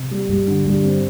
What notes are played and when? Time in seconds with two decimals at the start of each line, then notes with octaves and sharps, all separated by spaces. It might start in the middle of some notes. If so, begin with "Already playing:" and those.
Already playing: C3
0.11 G3
0.29 G2 G3
0.47 D3
0.66 G2 G3
0.85 C4